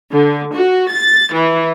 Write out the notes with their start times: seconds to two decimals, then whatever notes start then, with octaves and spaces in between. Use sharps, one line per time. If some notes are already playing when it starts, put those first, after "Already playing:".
0.13 D3
0.53 F#4
0.90 A6
1.33 E3